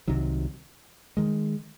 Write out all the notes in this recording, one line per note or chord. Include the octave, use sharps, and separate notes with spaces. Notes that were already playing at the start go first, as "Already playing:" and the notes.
C2 C3 D#3 F#3
D#3 G#3